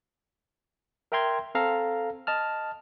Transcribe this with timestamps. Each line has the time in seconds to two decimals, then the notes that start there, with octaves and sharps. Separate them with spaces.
1.12 A#4 E5 G5 A#5 C6 G#6
1.55 C4 A4 F5 A#5
2.27 D#5 A5 F6